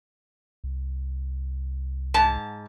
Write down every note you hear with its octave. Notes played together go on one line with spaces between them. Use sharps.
C2
G#2 A5